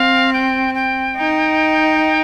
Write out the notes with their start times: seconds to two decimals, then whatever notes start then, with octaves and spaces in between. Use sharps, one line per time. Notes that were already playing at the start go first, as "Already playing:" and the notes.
Already playing: C4 F5
0.33 G5
0.75 G5
1.17 D#4